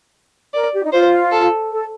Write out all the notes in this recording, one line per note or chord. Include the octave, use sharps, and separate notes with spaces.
A#4 D5
G4
D#4
F4 C5
A4
A4